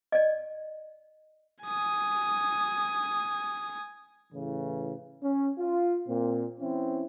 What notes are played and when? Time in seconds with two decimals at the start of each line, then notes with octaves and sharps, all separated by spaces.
0.12 D5 D#5
1.64 G#5 D#6
4.33 A2 C#3 E3
5.23 C#4
5.59 F4
6.07 A#2 C4
6.60 E3 C4 C#4 E4